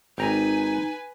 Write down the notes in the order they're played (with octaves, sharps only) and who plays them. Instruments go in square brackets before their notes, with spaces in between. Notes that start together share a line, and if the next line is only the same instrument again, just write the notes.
[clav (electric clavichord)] G#1 G5 A#5 [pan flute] D#4 [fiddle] B4 G#5